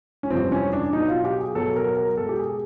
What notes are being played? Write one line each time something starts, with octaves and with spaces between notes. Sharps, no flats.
C#4
F2 C3 E3 G3 C4
C#4
D4
B2 F#3 D#4
F4
G4
G#4
B2 F#3 A4
A#4
A#4
B2 G#3 A4
G4
G#4